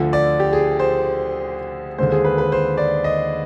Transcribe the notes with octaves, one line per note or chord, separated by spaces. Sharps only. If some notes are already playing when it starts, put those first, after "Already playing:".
Already playing: D2 D3 F3
D5
G4
G#4
C5
D#2 D3 G#3 C5
G#4
B4
B4
C5
D5
D#5